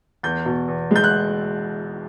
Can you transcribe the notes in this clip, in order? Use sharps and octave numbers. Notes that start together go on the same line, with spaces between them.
E2 G6
B2
E2
G#3 G6
F#6